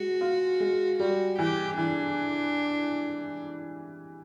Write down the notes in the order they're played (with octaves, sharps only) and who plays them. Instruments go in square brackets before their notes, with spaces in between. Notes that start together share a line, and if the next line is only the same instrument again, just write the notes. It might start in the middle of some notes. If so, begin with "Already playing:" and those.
Already playing: [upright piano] G#3 [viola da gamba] F#4
[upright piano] F4
G#3
[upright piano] G3 [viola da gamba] F#4
[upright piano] E3 [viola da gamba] G4
[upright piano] E3 [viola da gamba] D4